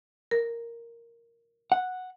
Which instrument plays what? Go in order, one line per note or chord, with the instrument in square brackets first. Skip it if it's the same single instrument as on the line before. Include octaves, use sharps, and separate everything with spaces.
[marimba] A#4
[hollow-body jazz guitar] F#5